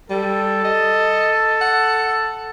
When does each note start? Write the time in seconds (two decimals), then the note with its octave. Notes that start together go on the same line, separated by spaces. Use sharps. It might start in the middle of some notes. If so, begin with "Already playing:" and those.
0.10 G3 A4
0.64 D#5
1.61 F#5